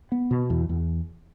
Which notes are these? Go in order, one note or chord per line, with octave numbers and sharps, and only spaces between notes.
B3
B2
E2
E2